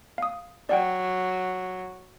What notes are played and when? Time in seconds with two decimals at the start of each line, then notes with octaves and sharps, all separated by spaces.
0.18 F5 D#6
0.69 F#3 D5 F#5 G5